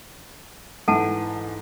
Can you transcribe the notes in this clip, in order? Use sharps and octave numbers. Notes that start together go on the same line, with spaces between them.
G#2 E3 A4 F#5 A5